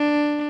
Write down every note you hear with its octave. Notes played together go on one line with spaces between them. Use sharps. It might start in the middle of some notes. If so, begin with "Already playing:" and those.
Already playing: D4